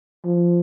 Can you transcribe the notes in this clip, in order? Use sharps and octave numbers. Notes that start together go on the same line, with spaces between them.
F3